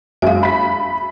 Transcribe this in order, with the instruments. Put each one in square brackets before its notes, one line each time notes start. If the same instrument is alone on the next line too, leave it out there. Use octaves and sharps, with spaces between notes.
[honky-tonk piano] F#2 F#3 G#3 [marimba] E5 F5
[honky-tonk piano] B5 B6